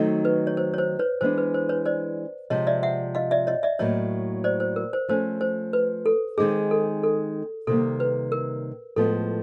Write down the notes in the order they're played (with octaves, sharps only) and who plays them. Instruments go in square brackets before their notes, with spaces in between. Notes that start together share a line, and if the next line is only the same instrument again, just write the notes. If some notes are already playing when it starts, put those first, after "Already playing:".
Already playing: [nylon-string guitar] D#3 F#3 A3 C4 D#4
[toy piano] B4
C#5
C5
C#5
C5
B4 C#5
[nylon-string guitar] E3 G#3 B3 D4 [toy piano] C5
[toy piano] B4
C5
B4 C#5
C5 D5
[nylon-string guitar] C3 F3 G#3 C4 [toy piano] C#5 D#5
[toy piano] D5 E5
E5 F#5
D#5 F5
D5 E5
C#5 D#5
D5 E5
[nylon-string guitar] A2 F#3 A#3 [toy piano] C#5 D#5
[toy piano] C5 D5
C5
A#4
C5
[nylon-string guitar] F3 A3 C#4 [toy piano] C5
[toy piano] C5
B4
A4
[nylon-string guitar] D#3 G#3 C4 D#4 [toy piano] G#4
[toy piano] A4
A4
[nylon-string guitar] C3 D#3 G3 A#3 [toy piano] A4
[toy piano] B4
A#4
[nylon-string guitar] A2 F3 G#3 B3 [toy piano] A4